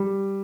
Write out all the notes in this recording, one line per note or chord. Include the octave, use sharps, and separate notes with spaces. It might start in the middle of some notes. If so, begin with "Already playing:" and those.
Already playing: G3